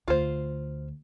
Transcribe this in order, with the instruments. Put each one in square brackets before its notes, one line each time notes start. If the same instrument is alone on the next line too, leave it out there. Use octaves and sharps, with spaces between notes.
[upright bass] D2 [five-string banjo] F4 C5